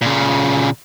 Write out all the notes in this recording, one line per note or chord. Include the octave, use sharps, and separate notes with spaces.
A#2 C#3